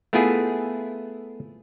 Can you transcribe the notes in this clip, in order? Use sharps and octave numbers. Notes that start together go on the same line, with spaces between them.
A3 B3 E4 F4 G#4